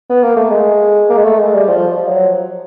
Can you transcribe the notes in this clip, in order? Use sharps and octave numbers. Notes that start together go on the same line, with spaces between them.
B3
A#3
A3
G#3
A#3
G#3
A3
G#3
G3
F3
F3
F#3